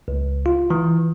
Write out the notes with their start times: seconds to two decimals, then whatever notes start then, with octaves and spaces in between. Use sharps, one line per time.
0.08 C#2
0.46 F4
0.70 E3